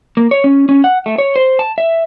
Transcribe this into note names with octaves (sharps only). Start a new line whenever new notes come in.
A#3
C#5
C#4
C#4
F#5
A3
C#5
C5
A5
E5